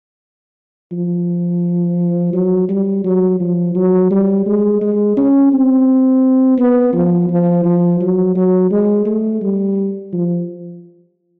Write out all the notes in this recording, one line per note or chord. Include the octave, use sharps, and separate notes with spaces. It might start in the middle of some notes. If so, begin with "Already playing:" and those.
F3
F#3
G3
F#3
F3
F#3
G3
G#3
G#3
C#4
C4
B3
F3
F3
F3
F#3
F#3
G#3
A3
G3
F3